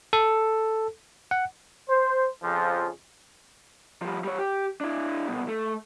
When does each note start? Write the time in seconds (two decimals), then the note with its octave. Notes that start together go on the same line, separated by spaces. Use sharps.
0.13 A4
1.31 F#5
1.90 C5
2.43 F2 C#3 F3
4.02 F3 G3
4.24 G3 C#5
4.39 G4
4.81 D4 E4
5.27 C2 B2
5.48 A3